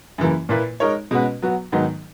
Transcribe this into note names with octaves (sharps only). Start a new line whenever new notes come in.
F#2 C#3 E3 A#3 E4
A#2 A#3 E4 B4
G#3 D#4 A#4 C#5
B2 G#3 C#4 F#4 B4
F#3 B3 F#4
G#2 D#3 F#3 B3 D#4